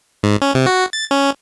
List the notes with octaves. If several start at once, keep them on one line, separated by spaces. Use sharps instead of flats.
G#2
C#4
C3
F#4
A6
C#4